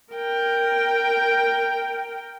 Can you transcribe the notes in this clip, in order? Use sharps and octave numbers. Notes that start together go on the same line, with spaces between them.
A#4 G5